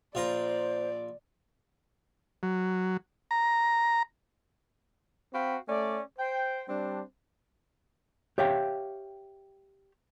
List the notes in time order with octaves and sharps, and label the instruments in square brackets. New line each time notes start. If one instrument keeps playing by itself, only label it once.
[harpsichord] A#1 F4 A#5 [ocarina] C5 [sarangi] D5
[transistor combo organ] F#3
A#5
[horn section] C4 F#4 F5 G5 B5
A3 C#4 D5
C5 G5
G3 C4 D4
[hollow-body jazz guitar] G4 C#5 E5 F5 G5